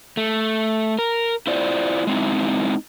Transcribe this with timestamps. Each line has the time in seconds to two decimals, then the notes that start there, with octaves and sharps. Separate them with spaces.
0.17 A3
0.99 A#4
1.47 E4 F4 C5 D5
2.07 G#3 C4 D#4 E4